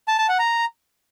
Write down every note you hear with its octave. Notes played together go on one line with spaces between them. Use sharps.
A5
A5
F#5
A#5